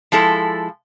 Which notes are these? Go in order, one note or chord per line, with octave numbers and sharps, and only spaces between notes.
F3 G#3 E4 A4